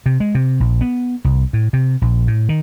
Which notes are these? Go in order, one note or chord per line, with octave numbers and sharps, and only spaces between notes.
C3
G#3
C3
A#1
B3
C2
A2
C3
A#1
A2
D#3